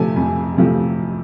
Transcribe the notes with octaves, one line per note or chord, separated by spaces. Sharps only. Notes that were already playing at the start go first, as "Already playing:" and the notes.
Already playing: C3 F3 A3 C4 G#5 A5
F2
C3 F3 A3 C4